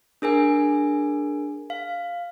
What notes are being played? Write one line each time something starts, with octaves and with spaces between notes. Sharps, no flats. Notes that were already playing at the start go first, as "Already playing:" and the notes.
D4 G#4 A#4 G#5
F5